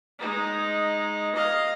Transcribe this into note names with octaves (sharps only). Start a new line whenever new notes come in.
G#3 D#4
D#5 F5